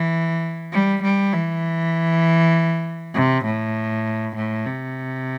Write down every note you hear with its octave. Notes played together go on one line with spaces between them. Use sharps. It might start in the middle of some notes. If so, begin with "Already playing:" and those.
Already playing: E3
G3
G3
E3
C3
A2
A2
C3